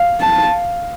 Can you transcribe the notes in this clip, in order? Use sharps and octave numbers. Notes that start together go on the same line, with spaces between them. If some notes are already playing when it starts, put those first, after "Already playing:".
Already playing: F5
A5